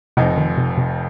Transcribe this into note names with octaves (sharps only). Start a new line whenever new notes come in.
F1 F2 C3 F3 D#4
D#3
C3
C3